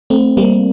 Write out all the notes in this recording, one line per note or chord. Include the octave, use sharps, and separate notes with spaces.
A3 C4
G3 A#3